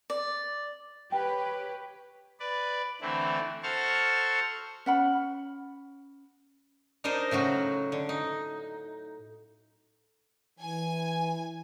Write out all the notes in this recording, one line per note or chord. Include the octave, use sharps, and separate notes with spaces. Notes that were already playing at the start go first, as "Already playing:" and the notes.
D5
G4 B4 C#5 G5
B4 D5
D3 E3 A3 C4 E4
F#4 A4 C5 A5 C#6 F6
C#4 F#5 B5
D4 D#4 A#4 C5 D#5
A2 C#3 F#3 F#4
D3
D#4
E3 G#5